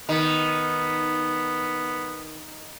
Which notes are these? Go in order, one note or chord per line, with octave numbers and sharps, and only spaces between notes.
D#3 B3